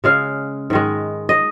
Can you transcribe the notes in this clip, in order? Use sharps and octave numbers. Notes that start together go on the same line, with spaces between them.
C#3 G#3 F5
G#2 D#3 G#3
D#5